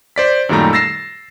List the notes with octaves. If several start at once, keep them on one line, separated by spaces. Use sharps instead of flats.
C5 D5 B6
F#2 A#2 D#3 G3 A3 A#5
E6 A6 A#6 C7 E7